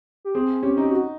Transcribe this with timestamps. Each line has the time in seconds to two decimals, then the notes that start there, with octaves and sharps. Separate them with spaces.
0.25 G4
0.35 C4 G#4
0.62 C#4 G4
0.77 D#4 G4
0.91 F#4